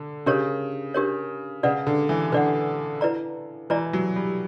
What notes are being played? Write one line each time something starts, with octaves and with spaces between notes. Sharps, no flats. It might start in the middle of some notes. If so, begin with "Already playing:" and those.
Already playing: D3
C#3 D4 G4 A#4 C#5
D4 G4 A#4 C#5
C#3 B4 D5 F#5
D3
E3
D3 B4 D5 F#5
E4 B4 D5 A#5
E3 E4 B4 D5 A#5
F#3
G3